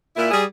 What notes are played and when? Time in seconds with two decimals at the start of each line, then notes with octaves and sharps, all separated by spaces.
0.16 A#2 E4
0.31 G3 G#4